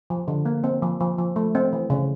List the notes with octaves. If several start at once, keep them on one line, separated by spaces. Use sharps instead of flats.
F3
D3
A#3
C4
F3
F3
F3
A3
C4
E3
C#3